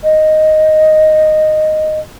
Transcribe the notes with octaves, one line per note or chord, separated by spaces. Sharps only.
D#5